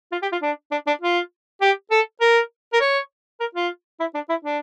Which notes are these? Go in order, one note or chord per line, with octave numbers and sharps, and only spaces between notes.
F4
G4
F4
D4
D4
D4
F4
G4
A4
A#4
A#4
C#5
A#4
F4
E4
D4
E4
D4